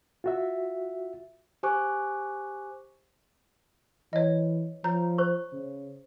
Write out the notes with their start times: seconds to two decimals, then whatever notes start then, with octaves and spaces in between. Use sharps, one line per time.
0.24 F4 F#4 E5
1.63 G4 C5 G#5 C#6 D6 F#6
4.13 E3 C#5 D#5
4.84 F3 C#5 A#5
5.18 C5 C#6
5.53 C#3